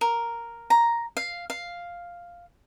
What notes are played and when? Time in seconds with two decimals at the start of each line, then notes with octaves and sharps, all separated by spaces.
0.01 A#4
0.70 A#5
1.17 F5
1.50 F5